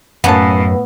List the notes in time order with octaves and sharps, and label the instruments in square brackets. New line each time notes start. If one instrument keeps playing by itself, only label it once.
[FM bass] F#2 [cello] A2 [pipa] A#3 C#4 A5 [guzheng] B3